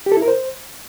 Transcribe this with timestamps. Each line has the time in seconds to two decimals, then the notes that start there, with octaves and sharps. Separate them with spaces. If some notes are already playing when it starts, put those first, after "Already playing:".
0.06 G4
0.12 A4
0.17 E4
0.22 A#4
0.28 C5